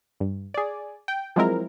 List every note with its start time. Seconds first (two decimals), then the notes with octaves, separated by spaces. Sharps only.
0.20 G2
0.54 G#4 D5
1.08 G5
1.36 F3 F#3 G#3 C4 E4 A#4